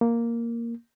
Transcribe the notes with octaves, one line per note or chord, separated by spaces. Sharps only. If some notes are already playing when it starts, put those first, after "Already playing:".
A#3